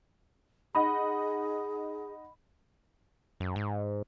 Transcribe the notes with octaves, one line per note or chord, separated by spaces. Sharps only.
D#4 G#4 D#5 F#5 B5
F#2
G#2